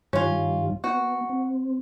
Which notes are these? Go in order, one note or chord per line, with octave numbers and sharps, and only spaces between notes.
G2 D#3 G3 C#4 F4
B3 F#4
C4